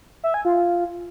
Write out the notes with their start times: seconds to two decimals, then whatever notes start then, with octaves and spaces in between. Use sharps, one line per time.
0.24 E5
0.34 G#5
0.45 F4